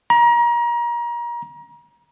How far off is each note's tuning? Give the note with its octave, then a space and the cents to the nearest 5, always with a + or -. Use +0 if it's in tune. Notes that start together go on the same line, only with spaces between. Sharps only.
A#5 +30